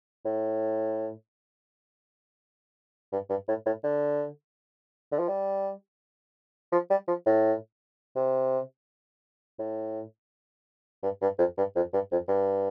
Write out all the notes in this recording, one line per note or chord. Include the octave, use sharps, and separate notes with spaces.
A2
G2
G2
A2
A2
D3
D3
F3
G3
F3
G3
F3
A2
C3
A2
G2
G2
F2
G2
F2
G2
F2
G2